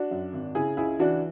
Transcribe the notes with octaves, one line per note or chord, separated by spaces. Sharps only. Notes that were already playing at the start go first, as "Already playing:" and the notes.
Already playing: D4 F#4
F#2
G#1
C#3 E4 G#4
C#2 E4 G#4
E3 D4 F#4